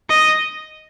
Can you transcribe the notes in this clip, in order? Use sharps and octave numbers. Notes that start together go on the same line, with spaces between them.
D#5